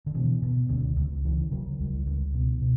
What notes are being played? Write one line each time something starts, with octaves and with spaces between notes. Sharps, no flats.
D3
B2 E3
B2
C#2 D3
C#2
C#3 E3
C#3 F#3
C#2 G3
C#2
B2
B2